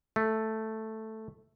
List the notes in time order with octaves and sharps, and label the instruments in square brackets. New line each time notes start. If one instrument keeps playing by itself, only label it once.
[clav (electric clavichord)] A3